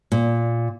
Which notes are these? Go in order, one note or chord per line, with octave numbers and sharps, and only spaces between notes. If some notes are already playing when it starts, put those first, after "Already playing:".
A#2